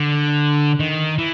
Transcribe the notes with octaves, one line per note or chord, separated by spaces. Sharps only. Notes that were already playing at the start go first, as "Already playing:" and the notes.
Already playing: D3
D#3
E3